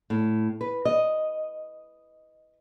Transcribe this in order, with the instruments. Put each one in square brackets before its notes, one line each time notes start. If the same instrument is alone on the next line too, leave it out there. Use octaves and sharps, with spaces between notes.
[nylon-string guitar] A2
B4
D#5